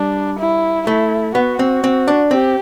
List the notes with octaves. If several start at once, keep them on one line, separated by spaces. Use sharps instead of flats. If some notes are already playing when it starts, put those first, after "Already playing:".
Already playing: G3 D4
E4
A3 E4
B3 F#4
C4
C4
D4
C4 G4